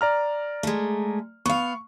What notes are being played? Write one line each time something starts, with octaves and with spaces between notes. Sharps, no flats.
D5 A#5 F6
G#3 A3
B3 F5 C#6